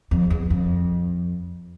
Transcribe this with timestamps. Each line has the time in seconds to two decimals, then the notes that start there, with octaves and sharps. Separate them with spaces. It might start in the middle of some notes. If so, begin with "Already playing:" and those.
0.11 F2
0.30 E2
0.50 F2